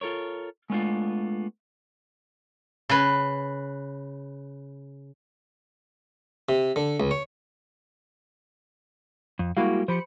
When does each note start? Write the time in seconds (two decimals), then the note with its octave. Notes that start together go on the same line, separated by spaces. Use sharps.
0.01 F4 A4 A#4 C#5
0.70 G#3 A3 B3 C#4 D4 F4
2.89 C#3 B4
6.49 C3
6.76 D3
7.00 C#2
7.11 C#5
9.39 F2
9.57 G3 G#3 A#3 E4 F#4 F5
9.88 F3 G4 C5 B5 C#7